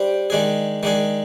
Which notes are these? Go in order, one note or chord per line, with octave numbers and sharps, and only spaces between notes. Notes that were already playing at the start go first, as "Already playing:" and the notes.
Already playing: G3 D4 G4 C5
D#3 G#3 D4 G#4
D#3 G#3 D4 G#4